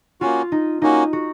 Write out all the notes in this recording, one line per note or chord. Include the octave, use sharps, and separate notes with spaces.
A#3 C#4 F4 F#4
D#4
A#3 C#4 D#4 F#4
F#4